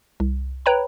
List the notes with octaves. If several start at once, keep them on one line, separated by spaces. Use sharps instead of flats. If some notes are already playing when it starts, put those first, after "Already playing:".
C2
B4 C#5 G5 A#5 B5